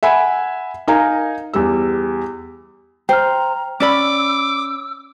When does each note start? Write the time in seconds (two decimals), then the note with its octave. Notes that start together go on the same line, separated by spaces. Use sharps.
0.03 E5 F#5 G#5 B5
0.88 D#4 A#4 F5 G#5 A#5
1.53 E2 G3 E6
3.09 C5 G5 A#5 F6
3.80 C#4 D5 B5 D6 E6